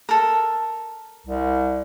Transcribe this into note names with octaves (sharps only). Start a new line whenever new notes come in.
A4 A#4
C2